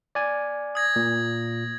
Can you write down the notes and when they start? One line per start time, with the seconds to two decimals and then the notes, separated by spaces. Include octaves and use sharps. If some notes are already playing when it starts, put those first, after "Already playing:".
0.15 D5 G#5
0.75 D#6 G#6 A#6
0.96 A#2